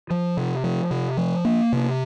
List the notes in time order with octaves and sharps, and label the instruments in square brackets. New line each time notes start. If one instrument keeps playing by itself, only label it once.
[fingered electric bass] F3
C3
F3
C3
F3
A#3
C3